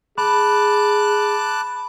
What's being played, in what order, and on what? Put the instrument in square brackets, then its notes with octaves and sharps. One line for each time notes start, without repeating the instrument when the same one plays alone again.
[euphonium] G#4 [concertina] A5 D6 F#6 [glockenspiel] B5